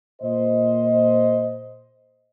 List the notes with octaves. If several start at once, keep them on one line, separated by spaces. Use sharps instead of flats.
A#2 C5 D#5